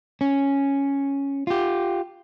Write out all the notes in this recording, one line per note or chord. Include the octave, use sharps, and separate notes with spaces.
C#4
F4 G4